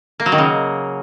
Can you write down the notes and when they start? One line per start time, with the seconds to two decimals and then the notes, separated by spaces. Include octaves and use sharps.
0.20 A#3
0.26 F#3
0.32 D#3
0.38 C#3